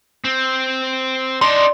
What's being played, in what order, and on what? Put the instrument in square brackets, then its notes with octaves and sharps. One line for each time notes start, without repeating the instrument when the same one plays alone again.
[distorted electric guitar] C4
[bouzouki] D4 [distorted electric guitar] D#4 D5 [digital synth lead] C6